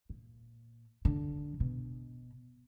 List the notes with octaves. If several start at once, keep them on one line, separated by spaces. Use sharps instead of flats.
A#2
D3
B2